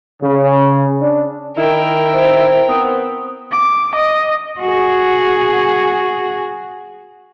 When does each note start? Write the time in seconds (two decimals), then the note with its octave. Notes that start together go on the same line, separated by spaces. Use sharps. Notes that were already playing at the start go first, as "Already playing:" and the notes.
0.22 C#3
1.01 D4
1.57 D#3 E4 A#4 G5
2.13 C5
2.69 B3 C4 D#6
3.51 D6
3.96 D#5
4.60 F#4 G#4